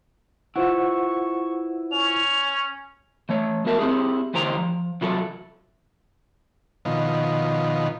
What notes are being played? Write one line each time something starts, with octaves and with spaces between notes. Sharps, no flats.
E4 F4 B4 C5 E5 F#5 C#6
C#4 F7
E3 A3 C#5
G#3 B3 F#4 A#4 E5 A5
C4 D4 E4 G4 G#4
D2 E3 G4 C5 A#5
F3
C3 E3 F#3 E4 F4 A4
B2 D#3 F3